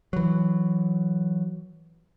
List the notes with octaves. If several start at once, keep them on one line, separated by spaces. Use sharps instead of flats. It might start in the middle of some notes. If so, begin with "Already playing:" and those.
E3 F#3